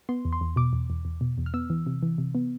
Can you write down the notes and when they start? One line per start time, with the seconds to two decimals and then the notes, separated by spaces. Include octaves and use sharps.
0.09 B3 C6
0.25 E2
0.33 C6
0.41 E2
0.56 B2 D6
0.73 E2
0.90 E2
1.05 E2
1.21 B2
1.38 E2
1.46 F6
1.54 B3 E6
1.70 E3
1.86 C3
2.03 E3
2.18 C3
2.35 B3